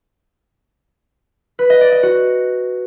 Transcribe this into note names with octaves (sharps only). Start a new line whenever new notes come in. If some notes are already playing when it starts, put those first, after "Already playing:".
B4
D#5
D5
D#5
F#4